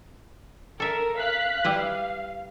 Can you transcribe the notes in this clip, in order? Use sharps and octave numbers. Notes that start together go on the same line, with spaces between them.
A4 A#4 E5
F5 F#6 B6
G3 E4 B4 F5